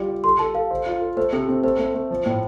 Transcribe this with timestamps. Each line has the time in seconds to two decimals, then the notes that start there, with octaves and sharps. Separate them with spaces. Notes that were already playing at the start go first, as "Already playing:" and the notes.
Already playing: G3 F4 D5
0.08 G4
0.24 A4 C6
0.39 A4 A5
0.55 A4 F5
0.71 C5
0.86 F4
1.02 A4
1.17 A3 C5
1.32 C3 A4
1.48 C4
1.64 A3 C5
1.79 A3
1.94 A3
2.11 F3
2.26 A2